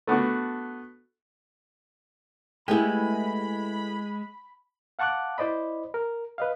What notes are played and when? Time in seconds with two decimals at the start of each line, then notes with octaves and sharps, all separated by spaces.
0.07 A3 B3 D4 F#4
2.68 G#3 A3 B3 E4 G4 G#4 B5
4.99 F5 F#5 A5 C#6 D6 F#6
5.38 E4 C5 D5 D#5 B5
5.94 A#4
6.38 B4 D#5 F5